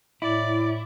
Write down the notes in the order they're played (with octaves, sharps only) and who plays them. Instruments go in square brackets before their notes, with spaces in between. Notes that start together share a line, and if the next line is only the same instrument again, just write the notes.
[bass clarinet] A2 [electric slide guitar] E4 [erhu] D5